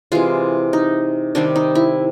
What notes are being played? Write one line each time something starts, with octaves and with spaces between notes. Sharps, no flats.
C3 E3 G#3 F4
D#4
C3 D#3 G3 C4 D4
D#4
E4